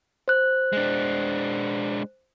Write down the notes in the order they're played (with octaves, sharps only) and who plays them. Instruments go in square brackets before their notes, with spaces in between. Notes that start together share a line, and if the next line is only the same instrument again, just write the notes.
[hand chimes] C5 F#6
[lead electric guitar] G#3 D4